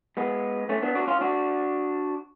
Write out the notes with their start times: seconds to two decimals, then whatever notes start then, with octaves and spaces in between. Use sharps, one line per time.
0.17 G#3 B3
0.69 A3 C#4
0.82 B3 D4
0.95 D4 F#4
1.07 C#4 F4
1.21 D4 F#4